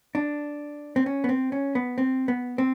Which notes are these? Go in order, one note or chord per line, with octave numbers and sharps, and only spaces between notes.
D4
C4
C#4
B3
C4
C#4
B3
C4
B3
C4